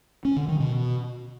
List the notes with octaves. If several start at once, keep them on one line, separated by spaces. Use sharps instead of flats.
C#4
D3
D#3
B2